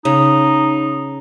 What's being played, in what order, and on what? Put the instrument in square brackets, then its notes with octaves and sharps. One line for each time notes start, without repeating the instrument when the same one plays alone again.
[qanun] C#3 [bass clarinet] D#4